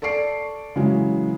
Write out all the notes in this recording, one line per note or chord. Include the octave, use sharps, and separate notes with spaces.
A4 D5 C#6 C7 D7
C#3 E3 F#3 G#3